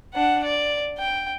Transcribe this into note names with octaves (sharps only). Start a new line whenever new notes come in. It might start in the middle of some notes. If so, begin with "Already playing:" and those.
D4 F#5
D5
G5